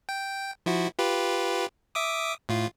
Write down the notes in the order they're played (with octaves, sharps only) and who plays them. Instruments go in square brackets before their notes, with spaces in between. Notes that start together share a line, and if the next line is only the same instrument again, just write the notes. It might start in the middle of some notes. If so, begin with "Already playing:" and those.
[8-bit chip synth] G5
F3 E4 F#4
F4 G4 B4
E5 D6 D#6
A2 F4